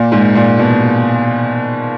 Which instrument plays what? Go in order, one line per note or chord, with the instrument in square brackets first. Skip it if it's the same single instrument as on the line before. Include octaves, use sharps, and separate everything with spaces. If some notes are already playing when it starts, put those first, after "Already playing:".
Already playing: [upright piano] A#2
G#2
A#2
B2